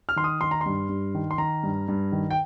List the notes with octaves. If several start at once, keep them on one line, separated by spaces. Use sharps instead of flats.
F6
D#3 C6
D#6
D#3 C6
A#5
G2 C6
G2
D#3
C6
D#3 A#5
G2
G2
D#3
G5